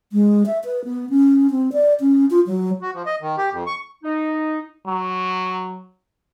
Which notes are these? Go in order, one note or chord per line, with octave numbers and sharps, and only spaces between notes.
G#3
E5
B4
B3
C#4
C4
D5
C#4
F4
F#3
F#4
F3
D#5
D#3
G4
F2
C#6
D#4
F#3